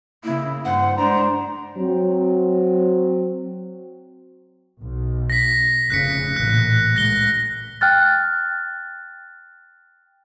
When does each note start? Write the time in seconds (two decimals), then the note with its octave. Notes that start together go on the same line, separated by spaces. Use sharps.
0.24 C#3 A#3 E4
0.65 G2 C5 F#5
0.98 G#3 D4 C5 A#5
1.78 F#3 C4
4.80 B1
5.30 A#6 B6
5.90 F1 C#3 F#6 B6 C#7
6.36 A1 A#2 F#6
6.96 C#2 A#6 G7
7.81 G5 F6 F#6 A6